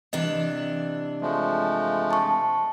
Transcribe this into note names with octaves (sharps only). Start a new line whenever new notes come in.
C3 E3 D4 D#5
F3 G#3 A3
A5 C#6